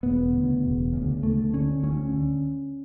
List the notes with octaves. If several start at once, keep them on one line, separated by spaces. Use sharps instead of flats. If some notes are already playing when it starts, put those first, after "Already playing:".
E1 B3
D2 C#3
E1
D2 C#3
D2 A3
D3 C#4
D2 C#4
D3